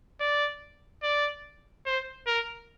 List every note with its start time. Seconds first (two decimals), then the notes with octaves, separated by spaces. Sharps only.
0.20 D5
1.03 D5
1.86 C5
2.27 A#4